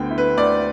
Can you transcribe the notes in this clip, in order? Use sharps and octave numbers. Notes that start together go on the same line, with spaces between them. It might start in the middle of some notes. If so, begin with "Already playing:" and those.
Already playing: D2 D3 B3 G5
E4
B4
D2 D5